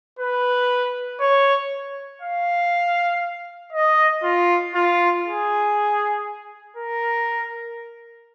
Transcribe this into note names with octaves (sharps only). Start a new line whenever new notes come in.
B4
C#5
F5
D#5
F4
F4
G#4
A#4